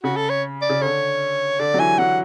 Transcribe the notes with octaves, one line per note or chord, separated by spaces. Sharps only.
C#3 F#4
A4
C#5
D5
C#3
D3 C#5
D3 D5
F#3
E3 G#5
F#3 F#5